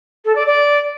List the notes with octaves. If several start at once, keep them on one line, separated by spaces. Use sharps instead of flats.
A4
D5
D5